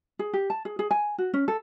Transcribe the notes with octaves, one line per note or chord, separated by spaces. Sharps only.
G#4
G4
A5
G#4
G#4
G#5
F#4
C#4
A4